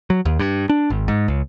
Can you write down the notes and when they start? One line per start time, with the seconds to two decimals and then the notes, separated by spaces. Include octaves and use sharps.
0.10 F#3
0.25 D#2
0.39 G2
0.69 D4
0.90 G#1
1.08 G#2
1.28 C#2